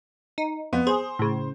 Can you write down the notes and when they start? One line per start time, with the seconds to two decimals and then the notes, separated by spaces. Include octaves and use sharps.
0.38 D#4
0.73 F2 B3
0.87 G#4 C5
1.19 A2 C#3